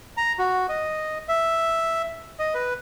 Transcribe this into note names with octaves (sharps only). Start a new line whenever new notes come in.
A#5
F#4
D#5
E5
D#5
B4